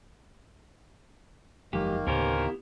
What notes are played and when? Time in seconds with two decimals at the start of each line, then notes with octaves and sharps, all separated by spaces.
1.73 F#1 E2 D#3 F3 F#3 G#3 A#3 G4
2.07 D2 A2 C#3 B3 C#4 G4 A#4 C5
2.37 B3 E4 G4